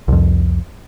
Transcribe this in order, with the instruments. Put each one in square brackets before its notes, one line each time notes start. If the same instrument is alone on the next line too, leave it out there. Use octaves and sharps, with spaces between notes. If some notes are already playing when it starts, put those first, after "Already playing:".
[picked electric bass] C2 F2